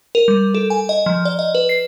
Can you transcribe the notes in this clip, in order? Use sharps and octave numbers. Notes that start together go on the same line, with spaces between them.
A#4
G3
A4
G#5
D#5
F3
D5
D#5
B4
C7